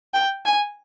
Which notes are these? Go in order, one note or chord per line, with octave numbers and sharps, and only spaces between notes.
G5
G#5